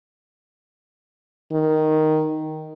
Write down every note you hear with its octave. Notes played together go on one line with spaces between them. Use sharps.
D#3